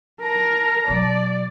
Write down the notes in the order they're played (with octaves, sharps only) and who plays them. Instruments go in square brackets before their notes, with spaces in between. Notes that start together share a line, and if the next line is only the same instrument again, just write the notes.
[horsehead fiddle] A#4 [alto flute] A5 [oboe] A#5
[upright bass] B2 F#3 [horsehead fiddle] D5